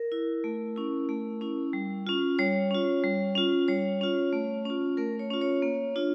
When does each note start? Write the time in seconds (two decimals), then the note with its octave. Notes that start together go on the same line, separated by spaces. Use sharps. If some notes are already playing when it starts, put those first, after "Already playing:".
Already playing: A#4
0.12 E4
0.44 A3
0.76 C#4 E4
1.09 A3
1.41 C#4 E4
1.73 G3
2.07 C#4 F4
2.39 G3 C#5
2.71 C#4 F4
3.04 G3
3.35 C#4 F4
3.68 G3 C#5
4.01 C#4 F4
4.33 A3
4.65 C#4 F4
4.97 A3 A#4
5.19 C#5
5.30 C#4 F4
5.41 C#5
5.62 A#3
5.96 D4 F4